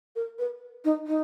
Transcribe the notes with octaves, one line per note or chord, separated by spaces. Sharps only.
A#4
B4
D#4
D#4